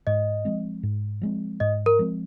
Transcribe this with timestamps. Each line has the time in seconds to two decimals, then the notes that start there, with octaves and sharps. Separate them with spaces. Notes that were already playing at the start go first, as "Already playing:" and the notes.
0.07 G#2 D#5
0.45 F3 G#3 C4
0.83 G#2
1.22 F3 G#3 C4
1.60 G#2 D#5
1.86 A#4
1.99 F3 G#3 C4